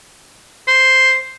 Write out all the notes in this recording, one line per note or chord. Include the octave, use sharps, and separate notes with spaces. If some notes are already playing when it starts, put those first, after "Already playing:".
C5